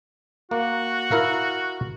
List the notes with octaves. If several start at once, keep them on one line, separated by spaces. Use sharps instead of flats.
A#3 F#4
E4 A#4 F5